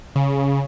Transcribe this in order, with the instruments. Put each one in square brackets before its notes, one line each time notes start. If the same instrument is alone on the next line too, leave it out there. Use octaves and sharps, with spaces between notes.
[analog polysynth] C#3